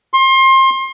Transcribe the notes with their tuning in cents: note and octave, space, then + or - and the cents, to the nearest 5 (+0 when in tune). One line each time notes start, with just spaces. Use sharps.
C6 +30